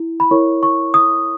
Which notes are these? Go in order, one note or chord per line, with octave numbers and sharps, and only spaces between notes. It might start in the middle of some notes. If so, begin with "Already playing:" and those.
Already playing: E4
B5
E4 A#4 C#5 C#6
C#6
D#6